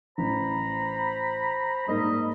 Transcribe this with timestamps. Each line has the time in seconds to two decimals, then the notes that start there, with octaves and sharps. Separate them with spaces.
0.18 A1 C5 A#5 B5
1.88 G#2 G3 A#3 D#5 B5